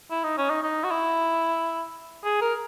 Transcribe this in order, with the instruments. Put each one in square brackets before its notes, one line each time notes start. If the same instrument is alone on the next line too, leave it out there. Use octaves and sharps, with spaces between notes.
[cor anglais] E4
D#4
C#4
D#4
D#4
F#4
E4
G#4
A#4